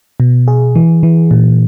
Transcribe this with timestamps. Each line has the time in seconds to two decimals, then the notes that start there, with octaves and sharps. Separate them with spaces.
0.20 B2
0.48 G#4
0.76 E3
1.03 E3
1.31 A#2